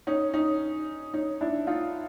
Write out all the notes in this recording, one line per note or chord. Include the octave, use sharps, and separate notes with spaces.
C#4 D#4
C#4 D#4
C#4 D#4
D4 E4
D#4 F4